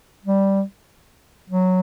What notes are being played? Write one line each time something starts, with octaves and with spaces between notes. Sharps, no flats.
G3
F#3